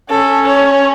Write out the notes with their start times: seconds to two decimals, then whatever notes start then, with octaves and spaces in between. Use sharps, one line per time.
0.10 C#4 A4
0.47 C#5